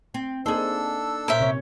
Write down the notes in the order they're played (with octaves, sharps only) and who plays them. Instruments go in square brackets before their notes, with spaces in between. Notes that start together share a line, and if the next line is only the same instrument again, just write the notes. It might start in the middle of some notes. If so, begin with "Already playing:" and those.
[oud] C4
[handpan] A#3 D#4 [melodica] D4 A4 E6 [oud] G#4 C5
[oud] A#2 C#4 [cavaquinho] A#4 C5 E5
[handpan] C3 C#5